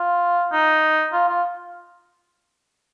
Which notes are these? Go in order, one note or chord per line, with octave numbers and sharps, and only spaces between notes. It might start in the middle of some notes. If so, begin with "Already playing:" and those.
Already playing: F4
D#4
F4
F4